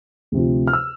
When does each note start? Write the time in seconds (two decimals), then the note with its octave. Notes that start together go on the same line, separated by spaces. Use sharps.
0.32 D2 C3 F3
0.67 F6
0.73 E6